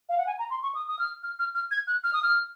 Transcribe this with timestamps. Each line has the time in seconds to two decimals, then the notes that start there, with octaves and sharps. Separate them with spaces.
0.09 F5
0.18 F#5
0.27 G#5
0.39 A#5
0.50 C6
0.62 C#6
0.75 D#6
0.88 D#6
0.99 F6
1.23 F6
1.39 F6
1.55 F6
1.71 G#6
1.87 F#6
2.04 F6
2.13 D#6
2.23 F6